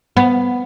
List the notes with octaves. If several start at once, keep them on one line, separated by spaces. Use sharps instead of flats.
B3